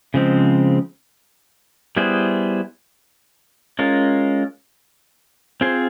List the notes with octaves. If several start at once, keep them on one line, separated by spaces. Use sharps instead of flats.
C#3 F3 G#3 C4
G3 B3 E4 G#4 C5
G#3 C#4 F4 A#4
C4 F4 G#4 C5